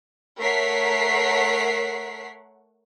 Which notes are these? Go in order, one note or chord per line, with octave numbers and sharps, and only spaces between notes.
A3 A#4 C#5 F#5 B6 C7